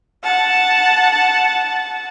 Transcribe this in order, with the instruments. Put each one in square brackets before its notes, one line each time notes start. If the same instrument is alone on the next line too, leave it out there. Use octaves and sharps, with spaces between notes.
[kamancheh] F#5 A5